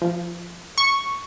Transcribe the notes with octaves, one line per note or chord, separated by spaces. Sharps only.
F3
C#6